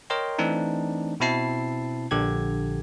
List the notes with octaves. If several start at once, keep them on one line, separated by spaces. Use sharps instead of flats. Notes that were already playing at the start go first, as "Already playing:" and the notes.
A#4 C#5 D#5 G5 A#5 C6
E3 A3 C4 D4 D#4
B2 C4 E4 A5 C7
A#1 D3 G4 G#6